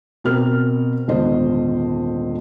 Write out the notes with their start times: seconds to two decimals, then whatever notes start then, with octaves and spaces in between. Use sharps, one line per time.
0.24 B2 C4 A#4 F6
1.08 D#1 G#1 D3 B3 C5 D#5